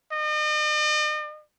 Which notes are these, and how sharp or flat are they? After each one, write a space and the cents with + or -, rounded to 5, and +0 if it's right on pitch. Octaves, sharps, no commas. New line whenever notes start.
D#5 -45